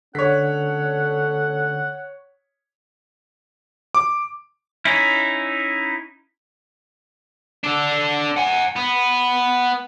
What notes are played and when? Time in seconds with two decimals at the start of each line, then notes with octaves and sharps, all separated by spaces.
0.15 D2 D3 C#4 A4 C#5 F#5 B6
3.95 D6
4.85 C#4 D#4 E4
7.64 D4 A4
8.37 F#5 G#5
8.76 B3